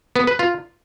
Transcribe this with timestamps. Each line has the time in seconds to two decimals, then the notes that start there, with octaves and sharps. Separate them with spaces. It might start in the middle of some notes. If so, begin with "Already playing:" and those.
0.16 B3
0.27 B4
0.39 F4